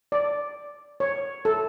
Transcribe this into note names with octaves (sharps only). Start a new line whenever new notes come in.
D5
C#5
A4